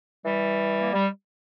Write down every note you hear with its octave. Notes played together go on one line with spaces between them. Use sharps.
E3 G3
A#3
G3